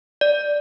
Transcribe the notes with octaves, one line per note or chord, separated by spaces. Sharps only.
D5